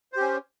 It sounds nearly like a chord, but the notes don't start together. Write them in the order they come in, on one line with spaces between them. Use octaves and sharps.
C5 G4 C#4